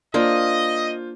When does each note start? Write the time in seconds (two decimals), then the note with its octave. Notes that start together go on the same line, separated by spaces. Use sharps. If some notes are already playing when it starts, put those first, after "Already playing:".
0.14 A#3 D4 F4 C5 D#5